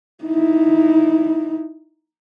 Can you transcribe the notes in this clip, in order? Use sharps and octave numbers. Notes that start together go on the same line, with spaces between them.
D#4 E4